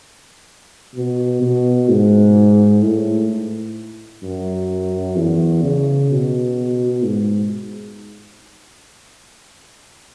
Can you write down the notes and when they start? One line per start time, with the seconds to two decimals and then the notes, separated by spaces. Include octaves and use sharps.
0.95 B2
1.41 B2
1.89 G#2
2.82 A2
4.23 F#2
5.17 E2
5.63 C#3
6.11 B2
7.04 G#2